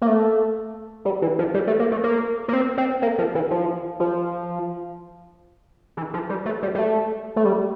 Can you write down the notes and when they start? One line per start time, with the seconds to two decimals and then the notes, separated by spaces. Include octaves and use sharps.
0.02 A#3
0.07 A3
1.05 G3
1.22 E3
1.39 F3
1.54 G3
1.67 A3
1.79 A#3
1.91 A3
2.03 A#3
2.48 A#3
2.53 C4
2.77 C4
3.02 A#3
3.18 F3
3.35 E3
3.51 F3
4.00 F3
5.97 E3
6.14 F3
6.29 G3
6.45 A3
6.62 G3
6.75 G3
6.79 A3
7.36 A3
7.45 G3